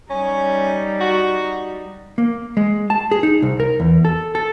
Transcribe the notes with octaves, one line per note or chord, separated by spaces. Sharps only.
G3 C#4 D#4
F#4
A#3
G#3
A5
G#4
D#4
C2
A#4
E2
A4
A4